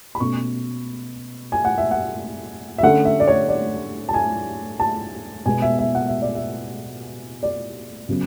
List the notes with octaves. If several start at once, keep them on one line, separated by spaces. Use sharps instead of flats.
B5
B2 A3 C#4 C#6
G#5
F#5
E5
F#5
E5
D3 A3 C#4 F#5
E5
D5
C#5
D5
A5
G#5
A5
B2 G#3 B3 G#5
E5
E5
F#5
E5
D5
E5
D5
C#3 F#3 B3